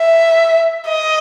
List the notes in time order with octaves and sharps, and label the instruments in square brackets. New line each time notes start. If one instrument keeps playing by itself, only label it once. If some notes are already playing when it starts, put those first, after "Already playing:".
Already playing: [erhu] E5
D#5